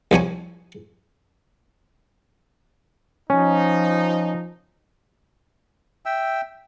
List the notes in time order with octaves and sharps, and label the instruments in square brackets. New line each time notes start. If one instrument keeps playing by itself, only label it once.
[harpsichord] C2 F3 C#5 G#5
[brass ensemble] F3 D#4 [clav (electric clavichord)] C#4
[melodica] E5 G5 E6